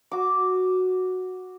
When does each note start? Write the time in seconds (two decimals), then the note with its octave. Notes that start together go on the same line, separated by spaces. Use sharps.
0.11 F#4 D6